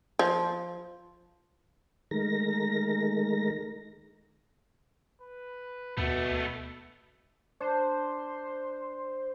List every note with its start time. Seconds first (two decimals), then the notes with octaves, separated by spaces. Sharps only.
0.19 F3
2.11 D#3 G#3 A3 A#4 A#6
5.21 B4
5.97 D2 B2 A3 B3 E5
7.60 D4 C5